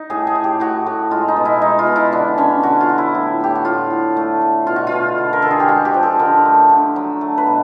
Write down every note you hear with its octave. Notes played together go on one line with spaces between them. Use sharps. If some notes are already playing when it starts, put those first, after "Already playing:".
Already playing: D#4
A2 G#4
G#4
A2
G4
A2 F#4
A2
G#3 F4
D#4
B2
E4
G#3 D#4
F4
B2
E4
D3 D4
D3 C#4
D3 F#4
F4
F#3
E4
A2
A2 G4
F#4
A2 F4
A2
A3
A3
B2 F4
F#4
B2 F4
D3
A#4
D3 A4
G#4
G4
G#3 F#4
G4
F3
A4
D3 A#4
A3
D3
F#3
A3
B4
B2